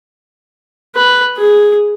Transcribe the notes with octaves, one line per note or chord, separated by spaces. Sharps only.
B4
G#4